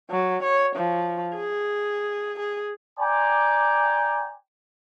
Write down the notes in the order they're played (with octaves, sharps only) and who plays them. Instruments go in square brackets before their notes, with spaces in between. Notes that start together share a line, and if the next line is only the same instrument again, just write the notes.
[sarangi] F#3
C#5
F3
G#4
G#4
[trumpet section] D5 G5 G#5 A#5 C6 D6